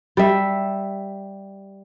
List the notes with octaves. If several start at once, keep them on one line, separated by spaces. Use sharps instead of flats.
G3 E5